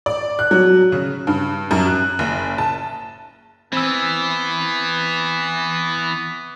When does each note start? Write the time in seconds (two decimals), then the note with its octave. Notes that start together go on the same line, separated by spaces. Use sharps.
0.06 D5
0.39 F#6
0.51 F#3
0.92 C#3
1.27 G2
1.71 F#2
1.87 F#6
2.19 F#1
2.58 A5
3.73 E3 B3 C4 E6